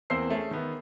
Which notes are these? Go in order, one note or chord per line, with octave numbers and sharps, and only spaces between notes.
E2 A#3 C4 C5 E6 C7
A3 C#4 G#4
D#3 B3